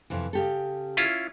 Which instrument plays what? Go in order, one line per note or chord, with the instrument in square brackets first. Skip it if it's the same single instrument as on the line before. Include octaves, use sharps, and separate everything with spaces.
[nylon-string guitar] F2 C3 E3
C#3 G4 A4
[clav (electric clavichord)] C#4 E4 F4